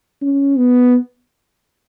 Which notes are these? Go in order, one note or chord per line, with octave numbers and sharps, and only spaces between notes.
C#4
B3